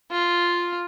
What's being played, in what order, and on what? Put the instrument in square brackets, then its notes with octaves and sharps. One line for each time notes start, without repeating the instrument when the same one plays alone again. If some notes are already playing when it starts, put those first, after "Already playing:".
[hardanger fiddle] F4